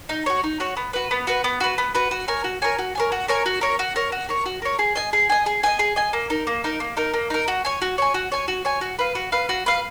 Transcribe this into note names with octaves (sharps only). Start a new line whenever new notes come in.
D#4
F#4 C#5
D#4
F#4 C#5
B3
F#4 B4
B3
F#4 B4
B3
F#4 B4
B3
F#4 B4
F#4
A#4 C#5 G#5
F#4
A#4 C#5 G#5
F#4
A#4 C#5 G#5
F#4
A#4 C#5 G#5
F#4
A#4 C#5
F#4
A#4 C#5
F#4
A#4 C#5
F#4
A#4 C#5
G#4
D#5 G#5
G#4
D#5 G#5
G#4
D#5 G#5
G#4
D#5 G#5
A#3
D#4 A#4
A#3
D#4 A#4
A#3
D#4 A#4
A#3
D#4 A#4
F#4
C#5 G#5
F#4
C#5 G#5
F#4
C#5 G#5
F#4
C#5 G#5
F#4
B4 F5
F#4
B4 F5
F#4
B4 F5